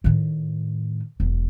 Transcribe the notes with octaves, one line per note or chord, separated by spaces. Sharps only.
A2 D#3
E1 F#3